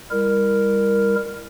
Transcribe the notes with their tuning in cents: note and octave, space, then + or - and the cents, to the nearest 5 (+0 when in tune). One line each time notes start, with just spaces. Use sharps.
G3 +25 E4 +10 A#4 +0